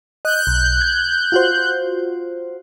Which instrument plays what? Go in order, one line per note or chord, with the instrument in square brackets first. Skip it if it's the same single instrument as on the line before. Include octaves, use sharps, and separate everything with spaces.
[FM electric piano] D#5 [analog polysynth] F#6 G6
[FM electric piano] B1
G#6
F4 F#4 C5